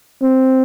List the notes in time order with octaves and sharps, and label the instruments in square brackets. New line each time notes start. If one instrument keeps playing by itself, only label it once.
[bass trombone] C4